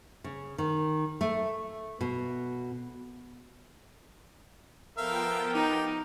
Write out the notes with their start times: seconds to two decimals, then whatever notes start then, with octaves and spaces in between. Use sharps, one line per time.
0.24 C#3
0.58 D#3
1.21 A3
2.01 B2
4.98 F3 B3 A4 A#4 E5 F5 G5
5.54 D#4 G4